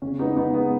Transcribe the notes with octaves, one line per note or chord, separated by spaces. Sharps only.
C#3 C#4
G#3 B3 D#4
C#3 B3 D#4
G#3 B3